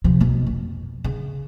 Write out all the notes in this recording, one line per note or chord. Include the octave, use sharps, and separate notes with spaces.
C3 F3
B1 B2
F2
C#3